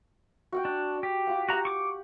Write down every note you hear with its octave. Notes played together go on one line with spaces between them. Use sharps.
F#4 F#5 G5
D4
G4
F4 F#5
F#4 G4 F#5 A#5
C#6 D6